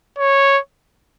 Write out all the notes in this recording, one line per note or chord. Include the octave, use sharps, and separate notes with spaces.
C#5